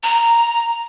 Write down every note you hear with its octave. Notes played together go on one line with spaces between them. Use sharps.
A#5